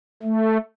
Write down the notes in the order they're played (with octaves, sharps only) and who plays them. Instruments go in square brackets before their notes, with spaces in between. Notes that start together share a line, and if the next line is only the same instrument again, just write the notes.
[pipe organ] A3